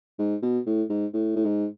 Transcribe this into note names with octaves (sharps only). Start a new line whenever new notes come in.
G#2
B2
A2
G#2
A2
A2
G#2